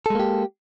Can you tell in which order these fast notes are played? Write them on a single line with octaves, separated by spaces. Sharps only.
A4 G#3 A#3 G4